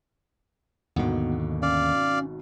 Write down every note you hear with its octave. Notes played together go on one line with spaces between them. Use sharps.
G#1 D#2 B2 D3 D#3 B3
C#4 D5 F5